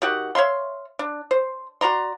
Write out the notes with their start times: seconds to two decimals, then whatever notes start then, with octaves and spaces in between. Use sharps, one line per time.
0.02 D#3 F#4 G4 F#5
0.35 C#5 E5 F5 C6
0.99 D4
1.31 C5
1.81 F#4 D5 A#5 C6